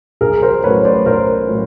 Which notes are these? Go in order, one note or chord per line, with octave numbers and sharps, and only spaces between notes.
B1 G#4 A#4
A#4 C5
A2 F#3 A3 C#4 B4 C#5
C5 D5
B1 A#4 C5
A2 F#3 A3 C#4